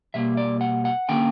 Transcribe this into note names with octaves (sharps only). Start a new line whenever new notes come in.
B2 G3 A#3 E5
D5
F#5
F#5
D3 A#3 C#4 G5